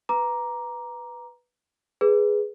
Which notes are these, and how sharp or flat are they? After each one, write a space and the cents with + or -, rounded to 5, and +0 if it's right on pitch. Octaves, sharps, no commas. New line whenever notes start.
B4 +0 A#5 +10 D6 +0
G#4 +0 B4 +0